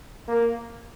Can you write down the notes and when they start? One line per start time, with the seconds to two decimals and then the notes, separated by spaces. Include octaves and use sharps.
0.28 A#3